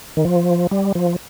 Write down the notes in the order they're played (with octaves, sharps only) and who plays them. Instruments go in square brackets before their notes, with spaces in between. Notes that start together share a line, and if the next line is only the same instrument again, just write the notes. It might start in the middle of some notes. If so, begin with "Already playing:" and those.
[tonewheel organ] D#3
F3
G3
F3